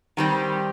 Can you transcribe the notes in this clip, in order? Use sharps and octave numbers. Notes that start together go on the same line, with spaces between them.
D#3 G3 C4